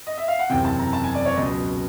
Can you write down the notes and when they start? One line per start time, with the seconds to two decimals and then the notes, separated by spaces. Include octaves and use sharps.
0.07 D#5
0.17 E5
0.28 F5
0.39 F#5
0.50 F#1 E2 C3 G5
0.65 A5
0.79 A#5
0.93 A5
1.04 G#5
1.15 D5
1.25 C#5
1.36 C#2 B2 F#3 D#5